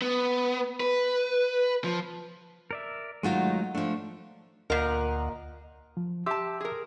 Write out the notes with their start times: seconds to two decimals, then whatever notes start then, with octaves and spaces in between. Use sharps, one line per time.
0.02 B3
0.80 B4
1.84 F3
2.71 A#4 D5 E5
3.23 D#3 F#3 G#3 A3 D#4 F4
3.75 F3 A3 D4
4.70 D2 A#2 A#4 D#5 F#5
5.97 F3
6.26 G4 E5 A5 C6 E6
6.60 G#4 A#4